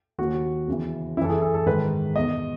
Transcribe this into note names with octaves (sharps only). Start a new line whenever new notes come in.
D#2 D#3 F#4
E2 C#3 E3
F#2 E3 E4 A4
G#4
A4
A4
G#2 D#3 B4
E2 B2 D#5